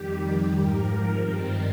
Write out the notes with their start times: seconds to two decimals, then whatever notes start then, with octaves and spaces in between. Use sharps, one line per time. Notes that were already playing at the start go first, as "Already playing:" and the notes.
Already playing: F2 D#3 G3 G4
0.53 G#2 F3 A#4
0.86 A#4
1.18 G2 D#3 G3 C4